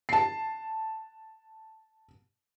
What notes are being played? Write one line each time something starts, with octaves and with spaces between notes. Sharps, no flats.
A5 C7